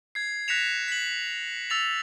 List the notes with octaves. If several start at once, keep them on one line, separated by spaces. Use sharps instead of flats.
G#6 C7
F#6 A#6 B6 C#7 E7 F7
B6 F#7
E6 A6 F7